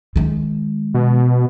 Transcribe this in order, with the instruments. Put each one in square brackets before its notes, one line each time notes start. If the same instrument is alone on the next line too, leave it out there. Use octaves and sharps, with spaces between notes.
[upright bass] D#3 G#3
[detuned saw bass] B2